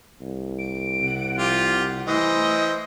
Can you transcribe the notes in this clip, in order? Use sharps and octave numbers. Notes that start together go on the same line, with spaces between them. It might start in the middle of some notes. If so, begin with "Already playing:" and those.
C2
D7
C3 F#5
F3 F4 G4
E3 A3 C5 D#5